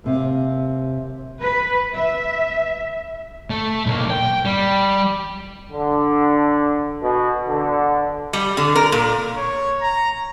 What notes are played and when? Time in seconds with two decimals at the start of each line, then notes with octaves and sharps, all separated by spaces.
0.04 D#2 C3 F5
1.41 B4
1.95 E5
3.50 A3
3.86 B1 A#3
4.10 G5
4.45 G3
5.72 D3
7.02 B2
7.47 D3
8.33 G3
8.57 D3
8.75 A#4
8.92 A#2
9.37 C#5
9.81 A#5